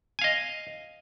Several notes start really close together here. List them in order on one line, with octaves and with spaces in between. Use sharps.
G#5 F5 D#5